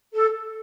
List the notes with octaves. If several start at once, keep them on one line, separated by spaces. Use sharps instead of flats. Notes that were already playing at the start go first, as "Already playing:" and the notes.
A4